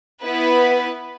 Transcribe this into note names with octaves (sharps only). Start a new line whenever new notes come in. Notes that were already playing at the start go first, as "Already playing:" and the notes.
B3 E4 B4